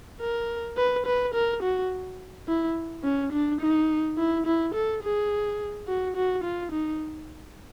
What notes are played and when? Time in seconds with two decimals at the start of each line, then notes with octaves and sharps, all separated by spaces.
0.20 A#4
0.77 B4
1.06 B4
1.34 A#4
1.62 F#4
2.48 E4
3.04 C#4
3.32 D4
3.61 D#4
4.18 E4
4.46 E4
4.74 A4
5.03 G#4
5.88 F#4
6.16 F#4
6.44 F4
6.72 D#4